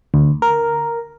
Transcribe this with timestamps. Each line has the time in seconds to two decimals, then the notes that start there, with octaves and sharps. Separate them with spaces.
0.14 D2
0.42 A#4